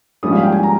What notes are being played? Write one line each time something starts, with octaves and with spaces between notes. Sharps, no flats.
A#1 G#2 G3 C#4 D#6
F5
G5
G#5
A#5